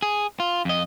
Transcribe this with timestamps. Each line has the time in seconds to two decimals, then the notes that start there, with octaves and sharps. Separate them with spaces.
0.02 G#4
0.40 F4
0.65 F2 D#5